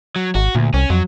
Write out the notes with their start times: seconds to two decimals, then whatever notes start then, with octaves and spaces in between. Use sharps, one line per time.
0.16 F#3
0.35 G#1 F#4
0.55 D2 A#2
0.74 C2 C#4
0.90 F2 F#3